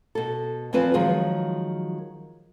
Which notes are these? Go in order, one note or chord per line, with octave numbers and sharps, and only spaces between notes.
B2 A4
E2 F3 C4 F4 B4 G#5
D#3 F3 F#3 G#3 G#4